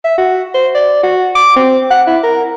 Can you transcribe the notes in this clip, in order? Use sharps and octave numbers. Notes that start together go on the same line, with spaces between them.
E5
F#4
C5
D5
F#4
D6
C4
F#5
E4
A#4